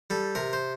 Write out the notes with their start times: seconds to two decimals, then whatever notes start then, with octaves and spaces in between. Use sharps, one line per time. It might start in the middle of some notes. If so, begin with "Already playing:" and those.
0.10 G3 A4
0.35 C3 A#4
0.53 C5